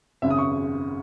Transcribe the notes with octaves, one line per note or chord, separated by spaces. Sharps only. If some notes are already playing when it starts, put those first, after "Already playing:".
G#1 F#2 C#3 E5
D#6
C#6